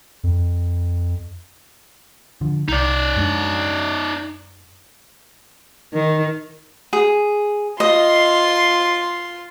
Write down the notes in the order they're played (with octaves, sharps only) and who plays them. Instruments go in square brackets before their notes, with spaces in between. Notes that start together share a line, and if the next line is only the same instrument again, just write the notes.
[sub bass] F2
[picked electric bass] D3 F3
[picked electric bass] C2 [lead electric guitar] D#4 D5
[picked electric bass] F#2 G#3 D4
[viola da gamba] D#3
[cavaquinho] G#4
[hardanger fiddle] F4 C6 [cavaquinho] D#5